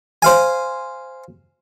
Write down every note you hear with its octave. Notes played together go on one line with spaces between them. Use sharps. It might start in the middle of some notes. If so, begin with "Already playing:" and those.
C5 F5 G#5